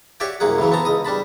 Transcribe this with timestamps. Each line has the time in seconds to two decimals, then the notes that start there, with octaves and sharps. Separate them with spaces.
0.20 F#4 G4 C#5 D5 E5 G5
0.40 C2 F#2 A#3 G#4 F#5
0.58 A2 C#3 E3 F#3
0.72 B3 C4 A5 A#5
0.85 C#2 D#5 D#6
1.05 G3 D4 A5 B5